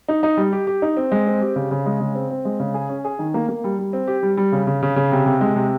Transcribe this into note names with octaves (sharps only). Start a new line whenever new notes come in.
D#4
D#4
G3
G4
G4
D#4
C4
G#3
C4
G4
C#3
C#3
G#3
C#3
C4
C4
G#3
C#3
G#4
C#4
G#4
D#3
A#3
A#3
G3
G3
C4
G4
G3
G3
C#3
C#3
C#3
C#3
C3
C3
G#3
C3